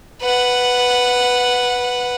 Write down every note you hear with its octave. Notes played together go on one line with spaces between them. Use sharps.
B4 F#5